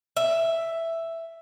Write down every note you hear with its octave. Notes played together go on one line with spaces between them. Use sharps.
E5